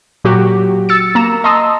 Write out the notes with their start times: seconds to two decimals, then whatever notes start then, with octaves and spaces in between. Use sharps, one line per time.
0.24 A#2 F#3 F#4 G4
0.89 E6 A6 C#7
1.15 A#3 A#5 E7
1.44 D#5 A5 A#5 C6 D#6 E6